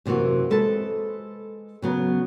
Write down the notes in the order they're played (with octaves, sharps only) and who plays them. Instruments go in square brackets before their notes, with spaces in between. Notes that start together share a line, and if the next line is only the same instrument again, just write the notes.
[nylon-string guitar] F#2 C3 E3 A#3 F#4
G#3 A4 B4 C5 A5
C#3 F#3 B3